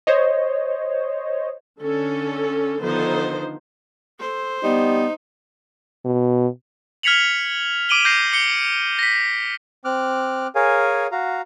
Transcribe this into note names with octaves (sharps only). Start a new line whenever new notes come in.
C5 C#5 D#5
D3 C#4 A4
D3 D#3 F3 B3 D#4 C5
A4 C5
G3 B3 D#4
B2
F6 G#6 B6 C#7 F7 F#7
D6 D7 D#7 F#7 G7
D6 G6 A#6 C7
D6 C#7 G7
A#6 B6
C4 D6 F6 F#6
G#4 A#4 C#5 F5 G#5
F#4 F5 A#5